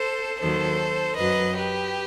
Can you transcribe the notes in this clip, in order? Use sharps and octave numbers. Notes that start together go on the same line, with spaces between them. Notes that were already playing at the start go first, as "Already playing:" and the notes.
Already playing: A4 C5
D#2 D#3 F#3 A4 C5
F#2 F#3 B4 D#5
G4 B4